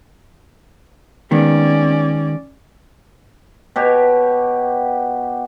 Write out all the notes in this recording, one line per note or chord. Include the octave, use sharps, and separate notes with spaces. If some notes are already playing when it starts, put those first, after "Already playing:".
D#3 G#3 B3 C#4 D5
B2 G4 C#5